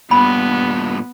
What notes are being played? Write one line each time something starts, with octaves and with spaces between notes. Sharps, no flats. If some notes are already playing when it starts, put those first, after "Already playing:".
G2 A#2 B3 B5